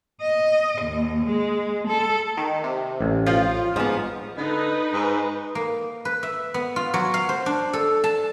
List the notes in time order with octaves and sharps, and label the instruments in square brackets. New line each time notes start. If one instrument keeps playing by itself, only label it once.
[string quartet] D#5
D#2
G#3
A4
[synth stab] D#3
C3
[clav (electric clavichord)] A1
[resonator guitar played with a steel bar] F3 [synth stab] F4
[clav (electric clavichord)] G#2 [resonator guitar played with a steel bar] F3 B3
[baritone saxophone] D3 [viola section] D#4 B4
[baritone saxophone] G#2
[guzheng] A#3
B4
E5
B3
F4
F#3
F5
C5
D4
A4
A5